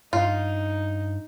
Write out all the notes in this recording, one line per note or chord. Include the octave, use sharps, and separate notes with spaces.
G2 D#4 F4